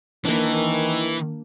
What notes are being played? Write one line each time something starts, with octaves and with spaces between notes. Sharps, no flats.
D#3 E3 A#3 D4